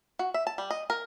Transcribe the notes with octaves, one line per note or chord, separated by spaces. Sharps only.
F#4
E5
A5
G3
D#5
A#4